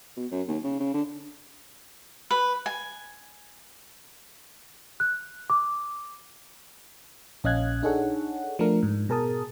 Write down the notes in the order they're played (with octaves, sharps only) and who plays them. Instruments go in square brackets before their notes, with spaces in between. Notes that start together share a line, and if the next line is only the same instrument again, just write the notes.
[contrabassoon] B2
F#2
D#2
C#3
C#3
D3
[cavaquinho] B4
G#5
[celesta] F#6
D6
[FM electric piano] A#1 C#4 D#5 F5 F#6 G#6
D4 D#4 G#4 A4 C#5 F#5
F3 A3 D4 A#4
G#2
B2 G#4 A#4 A5 D#6